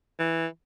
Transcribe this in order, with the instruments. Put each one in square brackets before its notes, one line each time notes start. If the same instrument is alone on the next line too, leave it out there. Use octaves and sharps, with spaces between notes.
[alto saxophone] E3